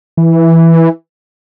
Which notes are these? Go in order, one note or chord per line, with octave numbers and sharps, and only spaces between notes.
E3